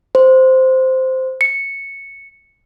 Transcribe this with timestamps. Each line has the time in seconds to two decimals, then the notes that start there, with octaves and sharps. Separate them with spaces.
0.15 C5
1.41 C#7